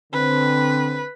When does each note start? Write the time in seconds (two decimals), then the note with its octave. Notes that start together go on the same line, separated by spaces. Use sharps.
0.13 D3 C4 B4